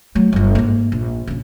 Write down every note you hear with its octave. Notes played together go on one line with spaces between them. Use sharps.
F#3 A3
G1 G2
G#2 A#3
A#1
A#1 C#3